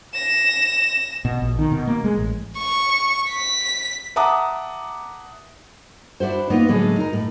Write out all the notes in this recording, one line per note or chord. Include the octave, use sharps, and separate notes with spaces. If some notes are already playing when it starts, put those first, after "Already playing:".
A#6 E7
B2
A#1
D#3
B2
A#3
G#3
A1
C#6
B6
E5 F#5 A5 A#5 D6 D#6
D4 E4 F#4 C5
A#3 B3 D#4 F4
A2 D3 F#3 G#3
D#4 A#4
A2